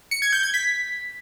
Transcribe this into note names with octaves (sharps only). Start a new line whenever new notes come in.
C#7
G#6
G6
G#6
B6